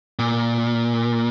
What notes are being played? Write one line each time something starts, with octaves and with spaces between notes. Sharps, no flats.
A#2